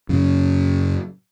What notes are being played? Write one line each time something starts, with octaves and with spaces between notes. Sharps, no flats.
F#2 C#3